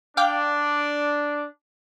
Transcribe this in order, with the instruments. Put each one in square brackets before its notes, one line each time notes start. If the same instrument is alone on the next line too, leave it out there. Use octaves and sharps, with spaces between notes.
[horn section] D4 [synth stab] F5 G5 D6